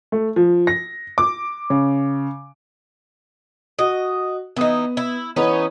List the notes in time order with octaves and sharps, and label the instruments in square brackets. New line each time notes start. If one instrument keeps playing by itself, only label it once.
[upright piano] A3
F3
A#6
D6
C#3
[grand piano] F#4 [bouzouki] D#5
[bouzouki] E3 D#4 [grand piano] B3 D#6
[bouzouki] E4
[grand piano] E3 B4 C#5 [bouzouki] B3 C#4 D#4